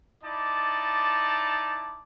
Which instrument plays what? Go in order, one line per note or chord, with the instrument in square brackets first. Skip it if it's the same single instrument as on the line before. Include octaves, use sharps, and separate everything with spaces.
[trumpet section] D#4 E4 D5 A5 D6